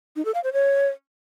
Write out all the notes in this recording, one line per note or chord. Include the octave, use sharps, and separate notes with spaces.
D#4
A4
F5
C5
C#5